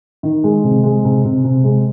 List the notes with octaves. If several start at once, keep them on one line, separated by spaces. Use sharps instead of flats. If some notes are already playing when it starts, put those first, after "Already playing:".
D#3
G#3
C3
G#3
C3
C3
C3
G#3